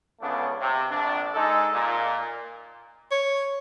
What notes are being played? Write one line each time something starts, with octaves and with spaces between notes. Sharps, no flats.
C#2 C#3 A3 B3 D4
C3
A#1 D4
G#3 D#4 A4
A#2
C#5